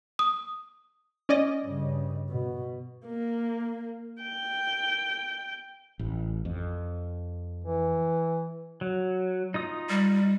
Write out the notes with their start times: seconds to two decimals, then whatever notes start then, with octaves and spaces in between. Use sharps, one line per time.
0.19 D#6
1.29 C#4 D5 D#5
1.62 G2 C#3
2.29 B2
3.06 A#3
4.22 G5
5.99 A1
6.45 F2
7.64 E3
8.81 F#3
9.54 D#4 F4 D#6
9.89 G3